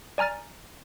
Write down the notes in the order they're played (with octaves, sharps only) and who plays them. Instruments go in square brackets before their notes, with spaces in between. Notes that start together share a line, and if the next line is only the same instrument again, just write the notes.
[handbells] D5 G#5 A#5 F6 A6